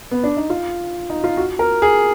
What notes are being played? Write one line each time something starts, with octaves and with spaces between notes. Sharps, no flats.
B3
D4
D#4
F4
D#4
F4
F#4
A#4
G#4